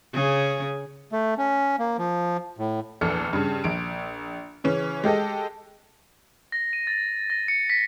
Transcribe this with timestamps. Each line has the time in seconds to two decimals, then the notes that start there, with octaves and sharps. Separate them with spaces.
0.14 C#3 G#4
1.12 A3
1.38 C#4
1.79 A#3
1.98 F3
2.58 A2
3.01 A#1 E2 A4 F6 C#7
3.33 G2 C#3
3.64 A#1 D7
4.64 C#3 E3 C#4
5.04 G#3 G4 A4 D#5
6.52 A#6
6.73 D#7
6.87 A6
7.30 A#6
7.48 C#7
7.70 B6